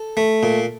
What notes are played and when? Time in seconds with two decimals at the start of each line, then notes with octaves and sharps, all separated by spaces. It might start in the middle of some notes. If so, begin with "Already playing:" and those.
Already playing: A4
0.17 A3
0.43 A#2